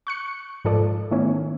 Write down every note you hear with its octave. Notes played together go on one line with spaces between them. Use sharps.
C#6 F#6 C#7
G#2 F3 A4 D5
D#3 A3 B3 C#4 E4